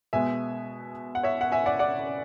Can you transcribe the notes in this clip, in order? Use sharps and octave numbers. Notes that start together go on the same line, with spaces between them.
B2 G#3 B3 E5 G#5
F#5
C#5 E5
F#5
E5 G#5
D5 F#5
D5 F#5